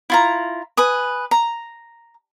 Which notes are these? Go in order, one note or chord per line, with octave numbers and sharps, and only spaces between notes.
E4 F4 A#5
B4 G#5 D#6
A#5